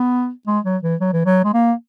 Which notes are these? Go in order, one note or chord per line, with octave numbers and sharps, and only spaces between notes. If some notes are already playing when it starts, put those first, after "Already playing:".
Already playing: B3
G#3
F#3
E3
F#3
E3
F#3
G#3
A#3